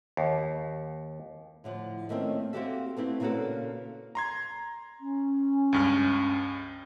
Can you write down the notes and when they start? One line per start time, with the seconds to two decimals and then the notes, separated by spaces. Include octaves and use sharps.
0.17 D#2
1.64 A2 D3 F3
2.09 D#3 A3 A#3 C4 C#4
2.53 A#3 C4 F#4 G4 A4 E5
2.97 A3 B3 C4 E4
3.20 A#2 C#3 A#3 B3 F#4 A4
4.15 A#5 C6 G#6
5.00 C#4
5.73 C#2 G2 F6